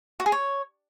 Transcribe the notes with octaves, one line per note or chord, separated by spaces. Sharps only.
F#4
G#4
C#5